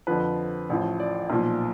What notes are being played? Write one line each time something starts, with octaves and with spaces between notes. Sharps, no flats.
F2 D3 F3 B4
A1 A2 F3
D5
B1 A#2 F3